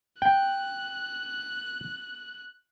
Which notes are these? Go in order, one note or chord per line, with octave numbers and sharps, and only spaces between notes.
G5 F#6